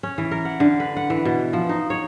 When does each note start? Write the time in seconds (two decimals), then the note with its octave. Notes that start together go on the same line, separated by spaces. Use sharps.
0.03 C#4
0.18 E3
0.31 A#4
0.45 F#5
0.60 D3
0.80 B4
0.97 F#5
1.10 E3
1.25 B2
1.53 F3
1.69 D#4
1.90 C#5